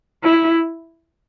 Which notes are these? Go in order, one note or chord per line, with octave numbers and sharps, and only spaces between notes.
E4